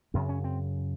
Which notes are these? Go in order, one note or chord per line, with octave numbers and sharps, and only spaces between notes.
F#2 C#3 C4
C#4
C4